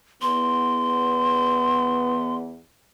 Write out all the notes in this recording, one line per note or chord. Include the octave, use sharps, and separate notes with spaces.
E2 B3 C6